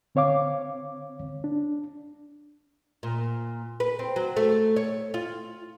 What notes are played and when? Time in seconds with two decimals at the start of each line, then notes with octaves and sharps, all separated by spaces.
0.15 D3 C4 C#5 F5 D6
1.44 D4
3.03 A#2
3.80 B4
3.99 C4
4.16 F#3
4.36 A3
4.76 C#5
5.14 F4